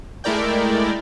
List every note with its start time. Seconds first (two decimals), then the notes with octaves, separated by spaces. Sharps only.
0.24 G#3 A3 E4 A#4 D5 G5